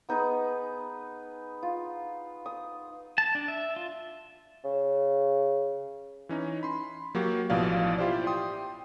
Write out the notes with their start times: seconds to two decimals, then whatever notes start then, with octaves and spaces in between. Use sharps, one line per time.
0.09 B3 D#4 G#4 B4
1.63 F4
2.46 D#6
3.18 A5
3.35 D4
3.48 E5
3.76 F4
4.65 C#3
6.29 E3 C#4 D#4
6.63 B5 C6
7.15 F#3 A#3 F#4 G4
7.50 A1 B2 E3 F3 D5 F5
7.98 E4 F4 G4 C5 D5
8.27 G5 C6 D#6